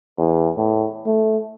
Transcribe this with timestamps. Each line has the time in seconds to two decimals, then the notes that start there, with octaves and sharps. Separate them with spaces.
0.18 E2
0.57 A2
1.06 A3